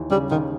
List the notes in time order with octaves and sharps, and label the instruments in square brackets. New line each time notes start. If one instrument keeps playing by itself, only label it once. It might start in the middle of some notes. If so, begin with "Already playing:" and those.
Already playing: [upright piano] D#2 E3
[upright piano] C#3 [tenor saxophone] G3
[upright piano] D#2 [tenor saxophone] D#3